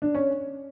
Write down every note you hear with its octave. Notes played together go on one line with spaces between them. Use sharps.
D4
C#4